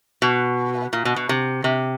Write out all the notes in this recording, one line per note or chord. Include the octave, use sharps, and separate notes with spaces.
B2
A#2
B2
B2
C3
C3